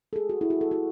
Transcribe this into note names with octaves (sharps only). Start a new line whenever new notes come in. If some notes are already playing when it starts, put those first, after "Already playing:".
A4
G#4
F#4
E4
F#4
A4
F#4